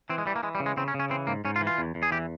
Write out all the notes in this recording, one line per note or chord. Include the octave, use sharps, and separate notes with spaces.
E3 C4
G#3
E3 G3
A#3
E3 G#3
G3
C#3
G#3
C#3 C4
C#4
C#3
C#4
E3 C4
G#2 A#3
G#2 C#4
F4
E3
F4
E2
E2
G#4
E3 G4